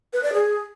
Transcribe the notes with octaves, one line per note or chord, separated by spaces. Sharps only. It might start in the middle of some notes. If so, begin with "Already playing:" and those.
B4
D5
G#4